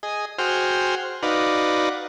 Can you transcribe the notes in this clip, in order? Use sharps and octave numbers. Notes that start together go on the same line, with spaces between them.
G#4 D#5
F#4 G#4 C5 G5 F6
D#4 F#4 B4 D5 F5